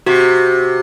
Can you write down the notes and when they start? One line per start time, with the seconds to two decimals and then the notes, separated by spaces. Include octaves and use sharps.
0.06 C3 F#4